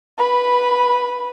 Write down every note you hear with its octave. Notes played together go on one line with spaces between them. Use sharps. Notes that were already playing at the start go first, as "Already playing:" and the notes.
B4 B5